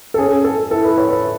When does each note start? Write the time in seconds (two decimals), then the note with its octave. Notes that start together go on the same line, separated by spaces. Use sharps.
0.14 A4
0.18 C#4 G#4
0.44 A4
0.71 E4 A4
0.84 B4
0.98 C#5
1.11 B4